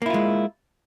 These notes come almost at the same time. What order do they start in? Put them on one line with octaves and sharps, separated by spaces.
A#3 E4 F4 G#3